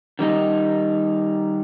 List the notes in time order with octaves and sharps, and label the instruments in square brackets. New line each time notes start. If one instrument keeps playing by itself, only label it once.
[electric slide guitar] D#3 G3 D#4